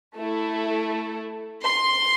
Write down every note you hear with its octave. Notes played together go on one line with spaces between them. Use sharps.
A3 E4 A4
C6